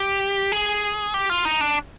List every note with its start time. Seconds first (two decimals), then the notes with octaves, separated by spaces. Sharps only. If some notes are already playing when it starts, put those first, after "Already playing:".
Already playing: G4
0.52 G#4
1.14 G4
1.30 F4
1.45 D#4
1.61 D4